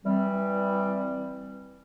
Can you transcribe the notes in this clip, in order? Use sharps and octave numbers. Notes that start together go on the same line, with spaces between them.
E3 G3 C4